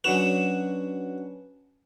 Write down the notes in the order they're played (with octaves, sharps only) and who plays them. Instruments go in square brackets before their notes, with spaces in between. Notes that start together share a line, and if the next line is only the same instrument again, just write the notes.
[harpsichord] F#3 F#4 [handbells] C#4 D4 B4 [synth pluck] E7